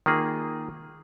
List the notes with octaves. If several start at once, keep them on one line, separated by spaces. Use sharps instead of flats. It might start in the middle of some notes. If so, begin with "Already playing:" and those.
D#3 A#3 F4 G#4